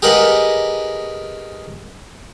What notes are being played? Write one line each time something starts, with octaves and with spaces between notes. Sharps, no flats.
G4 G#4 A#4 B4 D#5 F#5